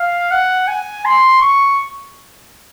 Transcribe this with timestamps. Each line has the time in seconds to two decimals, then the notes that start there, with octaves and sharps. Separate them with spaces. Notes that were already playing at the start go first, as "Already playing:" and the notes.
Already playing: F5
0.31 F#5
0.68 G#5
1.05 C6
1.42 C#6